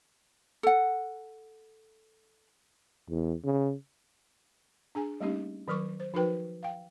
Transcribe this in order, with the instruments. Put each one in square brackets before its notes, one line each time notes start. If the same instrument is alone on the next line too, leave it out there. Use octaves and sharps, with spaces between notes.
[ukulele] A4 F#5
[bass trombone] E2
C#3
[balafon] D4 G#4 G#5
G3 A3 A#3 C#4 D#4 G4
D#3 F#3 A#4 C#6 D6
C5
F3 D#4 F#4 A#4 B4 G5
F5 G5